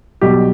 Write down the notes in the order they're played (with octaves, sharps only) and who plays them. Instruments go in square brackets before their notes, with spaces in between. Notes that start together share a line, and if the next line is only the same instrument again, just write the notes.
[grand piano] B1 B2 G3 G4